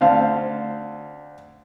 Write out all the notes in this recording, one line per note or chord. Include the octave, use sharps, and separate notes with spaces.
D2 C5 F5 A5